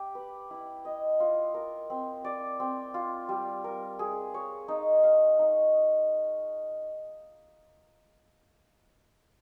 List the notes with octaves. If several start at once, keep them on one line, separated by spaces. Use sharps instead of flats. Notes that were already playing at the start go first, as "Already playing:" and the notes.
Already playing: G4
B4
E4
D#5
F4
A#4
C4
D5
C4
F4
G3
A#4
G#4
C#5
D#4
F5
D#4